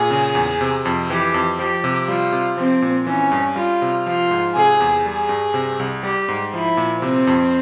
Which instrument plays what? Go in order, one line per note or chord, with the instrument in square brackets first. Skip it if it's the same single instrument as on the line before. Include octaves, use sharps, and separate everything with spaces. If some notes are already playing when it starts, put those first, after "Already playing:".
Already playing: [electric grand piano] A#2 [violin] G#4
[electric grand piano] C#3
E2
C3
F2
[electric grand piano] E3 [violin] G4
[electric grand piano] F2
[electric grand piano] F3 [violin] G4
[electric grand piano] C3
[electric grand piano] G3 [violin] F4
[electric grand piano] C3
[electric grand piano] F3 [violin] C4
[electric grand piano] A#2
[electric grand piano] E3 [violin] C#4
[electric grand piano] G2
[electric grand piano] G3 [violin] F4
[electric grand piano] C3
[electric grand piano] F3 [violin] F4
[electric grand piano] G#2
[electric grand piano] C3 [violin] G#4
[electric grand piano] E2
[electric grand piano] G3 [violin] G#4
[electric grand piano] G2
C3
C2
[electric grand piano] G3 [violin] G4
[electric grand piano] G#2
[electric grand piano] F3 [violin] E4
[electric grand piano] A#2
[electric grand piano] C3 [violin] C4
[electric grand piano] F2